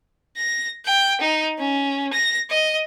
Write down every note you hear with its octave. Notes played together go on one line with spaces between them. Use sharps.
A#6
G5
D#4
C#4
A#6
D#5